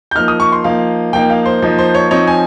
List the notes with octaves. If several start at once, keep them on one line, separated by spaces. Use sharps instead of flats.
G6
F3 A#3 D#4 F6
D#6
C#6
C6
F3 A#3 D#4 F5
F3 A#3 D#4 G5
F5
C5
F3 A#3 D#4
C5
C#5
F3 C4 D#4 C#5
G#5